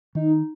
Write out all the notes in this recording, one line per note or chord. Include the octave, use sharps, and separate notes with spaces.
D#3 D#4